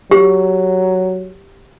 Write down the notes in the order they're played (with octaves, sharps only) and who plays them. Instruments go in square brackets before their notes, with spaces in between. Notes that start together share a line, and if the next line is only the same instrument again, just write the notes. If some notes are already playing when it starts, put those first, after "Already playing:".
[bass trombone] F#3 [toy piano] G4